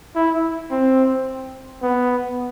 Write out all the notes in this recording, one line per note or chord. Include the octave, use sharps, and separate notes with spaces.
E4
C4
B3